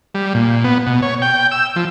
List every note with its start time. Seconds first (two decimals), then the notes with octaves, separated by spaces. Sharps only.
0.15 G3
0.34 A#2
0.64 B3
0.86 B2
1.02 C#5
1.22 G5
1.52 E6
1.76 F3